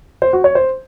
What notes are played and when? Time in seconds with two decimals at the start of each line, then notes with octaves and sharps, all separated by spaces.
0.22 C5
0.33 F#4
0.44 C#5
0.55 C5